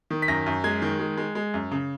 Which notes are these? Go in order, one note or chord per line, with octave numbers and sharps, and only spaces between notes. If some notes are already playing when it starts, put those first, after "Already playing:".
D#3
B6
F#2 A#6
F#2
G#3 G#6
D#3
G#3
G#3
G#3
F#2
C#3